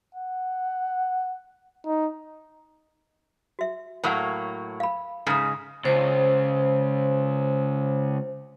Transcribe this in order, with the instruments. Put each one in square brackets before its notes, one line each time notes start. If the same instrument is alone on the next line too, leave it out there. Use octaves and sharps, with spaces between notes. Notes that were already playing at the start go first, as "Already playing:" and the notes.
[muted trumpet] F#5
D#4
[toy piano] F#4 E5
[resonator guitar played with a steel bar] A2 F#3 A#3 [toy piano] A#4 F#5
[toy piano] F5 B5
[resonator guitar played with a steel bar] G#2 C#3 G#3 [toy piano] A4 A#5
[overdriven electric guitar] C#2 [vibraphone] C5